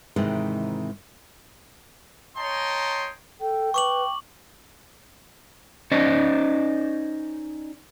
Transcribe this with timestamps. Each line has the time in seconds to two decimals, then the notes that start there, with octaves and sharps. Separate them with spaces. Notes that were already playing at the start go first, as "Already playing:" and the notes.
0.16 G#2 C3 D#3 E3 G#3
2.38 C#5 D#5 G5 A5 A#5 C6
3.40 A4 G5
3.74 B4 C#6 D6 F#7
5.92 C#4 D#4 C5 D5 D#5